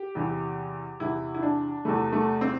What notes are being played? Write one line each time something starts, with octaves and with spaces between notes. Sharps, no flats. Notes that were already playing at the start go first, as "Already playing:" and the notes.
Already playing: G4
E2 C3 E3
E2 C3 E3 E4
E4
D4
E2 C3 E3 A3
A3
C4